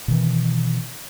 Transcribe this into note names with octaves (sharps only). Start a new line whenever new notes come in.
B2 D#3 E3